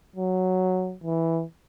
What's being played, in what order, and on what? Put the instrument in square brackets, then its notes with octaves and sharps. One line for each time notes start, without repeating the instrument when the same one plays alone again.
[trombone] F#3
E3